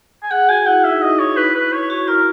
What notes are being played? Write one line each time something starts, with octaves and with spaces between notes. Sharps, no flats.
G#5
G#4 F#5
F#4 G#5
E4 F#5
D#4 E5
D#5
D#4
C#5
E4 B4
B4
C#5
F#4 C#5
E4 A#4